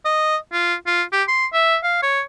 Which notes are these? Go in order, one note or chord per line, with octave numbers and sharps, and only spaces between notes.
D#5
F4
F4
G4
C6
E5
F5
C#5